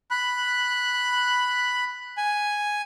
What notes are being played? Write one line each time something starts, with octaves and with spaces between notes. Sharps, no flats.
B5 F#6
G#5